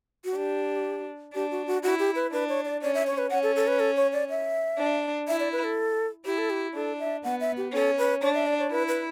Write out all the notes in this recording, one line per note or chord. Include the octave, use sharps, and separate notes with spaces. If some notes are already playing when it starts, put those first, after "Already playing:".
F#4
D4 G4
D4 G4
F#4
F#4
E4 F#4
G4
B4
D4 B4
C#5
D5
C#4 D5
E5
C#5
B4
C#4 F#5
A4
A4
B4
A4
C#5
D5
E5
D4
E4 E5
D5
B4
A4
E4 G4
A4
G4
D4 A4
E5
B3 F#5
E5
G4
C#4 A4
B4
D4 C#5
E5
D5
C#5
E4 B4
B4